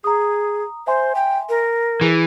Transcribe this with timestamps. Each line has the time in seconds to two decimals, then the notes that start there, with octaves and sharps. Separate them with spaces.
0.04 G#4 A#5 D#6
0.87 C5 E5 G#5 C6
1.15 G5
1.49 A#4
2.01 E3 G#4